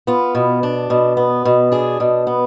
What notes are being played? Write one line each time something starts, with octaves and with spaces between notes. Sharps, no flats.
B3 F4
B2
D4
B2
B3
B2
D4 G#4
B2
B3